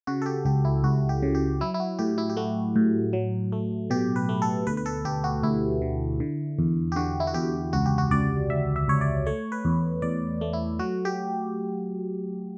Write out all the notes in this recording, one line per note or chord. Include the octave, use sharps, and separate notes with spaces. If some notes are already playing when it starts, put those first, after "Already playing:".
C#3 F#4
A4
G4
C#2 G4
E4
C#2 F#4
G4
C#3
G4
F#3 E4
E4
F#4
A2 G4
E4
G4
A3 F#4
A2
F#3
A3
B2 G4
B4
A3
A4
D2 B4
B4
A4
D2 G4
F#4
D2 E4
D3
D3
E2
G4
D3 F#4
E4
F#4
E2 G4
C#2 F#4
G4
F#4
C#2 D5
C#2 E5
E5
C#2 C#5
D5
A3 C#5
B4
E2
E2 D5
A3
E4
F#3 F#4
G4